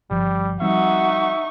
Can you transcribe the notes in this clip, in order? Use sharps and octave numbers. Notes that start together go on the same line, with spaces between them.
G1 F3 G3
F3 G3 C4 D#4 F#4 E5 C#6